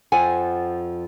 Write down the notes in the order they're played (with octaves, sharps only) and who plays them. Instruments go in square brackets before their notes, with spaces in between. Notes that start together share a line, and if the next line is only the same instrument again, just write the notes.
[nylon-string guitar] F2 F3 F#5 G#5